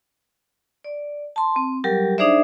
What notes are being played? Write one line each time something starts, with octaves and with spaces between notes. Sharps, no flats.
D5
A5 C6
C4
F#3 G3 G4 A#4
D4 D#4 G#4 C5 D5 E5